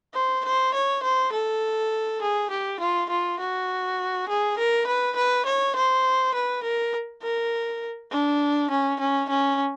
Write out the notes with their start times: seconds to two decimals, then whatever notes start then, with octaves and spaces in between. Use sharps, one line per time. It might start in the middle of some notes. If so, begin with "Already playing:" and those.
0.14 C5
0.45 C5
0.74 C#5
1.03 C5
1.32 A4
2.21 G#4
2.51 G4
2.80 F4
3.10 F4
3.39 F#4
4.29 G#4
4.58 A#4
4.87 B4
5.16 B4
5.45 C#5
5.76 C5
6.34 B4
6.64 A#4
7.23 A#4
8.11 D4
8.70 C#4
9.00 C#4
9.29 C#4